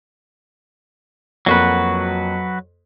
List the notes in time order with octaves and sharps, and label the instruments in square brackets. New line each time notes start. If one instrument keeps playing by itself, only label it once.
[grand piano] F2 A#3 [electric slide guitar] F#3 F#4 B4